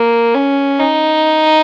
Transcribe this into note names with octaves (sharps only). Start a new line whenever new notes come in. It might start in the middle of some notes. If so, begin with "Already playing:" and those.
Already playing: A#3
C#4
D#4